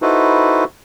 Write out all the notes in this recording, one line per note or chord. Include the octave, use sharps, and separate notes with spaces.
D#4 E4 F#4 A4 B4 C5